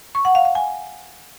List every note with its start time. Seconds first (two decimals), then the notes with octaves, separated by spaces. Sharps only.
0.15 C#6
0.25 F#5
0.35 F5
0.45 F5
0.55 G#5